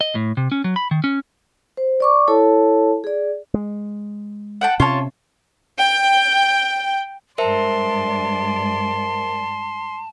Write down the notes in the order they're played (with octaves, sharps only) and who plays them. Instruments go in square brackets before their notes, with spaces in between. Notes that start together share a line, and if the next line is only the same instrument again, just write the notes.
[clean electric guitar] D#5
A2
C3
C#4
F#3
B5
D#3
C#4
[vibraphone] C5
D5 C#6 D6
E4 A4 C#5 A5
G#4 D5
[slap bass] G#3
[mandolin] F#5 G5 A5
[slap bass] C3 C#4 [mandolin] F4 C#5 A5
[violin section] G5
[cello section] G2 G#3 D5 [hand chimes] A#4 C5 E5 [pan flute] A5 [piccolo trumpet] C6